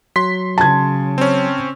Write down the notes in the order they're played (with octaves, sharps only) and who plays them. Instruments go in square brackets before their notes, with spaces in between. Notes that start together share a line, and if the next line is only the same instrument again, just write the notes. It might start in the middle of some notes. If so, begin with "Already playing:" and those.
[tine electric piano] F#3 [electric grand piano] C6 B6
[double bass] C#3 [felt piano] A5 G#6
[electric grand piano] C4 C#4